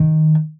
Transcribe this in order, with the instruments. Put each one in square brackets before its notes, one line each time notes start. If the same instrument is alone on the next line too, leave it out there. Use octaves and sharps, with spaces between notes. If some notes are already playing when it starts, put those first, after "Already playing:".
Already playing: [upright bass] D#3